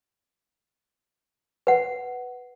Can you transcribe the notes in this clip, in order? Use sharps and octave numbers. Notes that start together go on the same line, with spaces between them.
B4 F#5